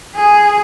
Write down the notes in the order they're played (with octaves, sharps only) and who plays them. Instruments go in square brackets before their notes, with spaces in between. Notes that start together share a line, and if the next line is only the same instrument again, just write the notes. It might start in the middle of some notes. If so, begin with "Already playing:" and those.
[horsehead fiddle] G#4